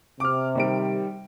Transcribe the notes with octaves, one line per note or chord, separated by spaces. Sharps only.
C3 D6 F6
D#3 G3 D7